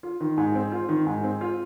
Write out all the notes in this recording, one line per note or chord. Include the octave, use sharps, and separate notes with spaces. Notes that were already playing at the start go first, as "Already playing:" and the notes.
F4
D#3
G#2
C4
F4
D#3
G#2
C4
F4